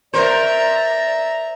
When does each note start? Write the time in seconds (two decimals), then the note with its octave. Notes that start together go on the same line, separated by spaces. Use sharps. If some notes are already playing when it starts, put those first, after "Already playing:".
0.14 A#4 C5 D5 E5 A#5